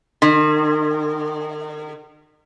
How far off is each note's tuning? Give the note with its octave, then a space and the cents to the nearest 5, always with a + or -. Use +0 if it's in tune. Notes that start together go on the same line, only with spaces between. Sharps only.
D#3 -40